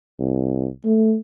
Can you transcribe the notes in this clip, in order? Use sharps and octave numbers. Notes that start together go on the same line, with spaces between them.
C2
A3